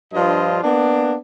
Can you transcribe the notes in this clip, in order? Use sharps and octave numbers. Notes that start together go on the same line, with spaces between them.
G2 F3 D4 F4 D#5
A#3 B3 D4